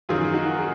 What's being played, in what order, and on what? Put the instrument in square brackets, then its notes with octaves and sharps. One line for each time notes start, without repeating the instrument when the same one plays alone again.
[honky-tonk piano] F#2 D#3 F#3 [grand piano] F4 G#4
[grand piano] D#4 F#4
G#4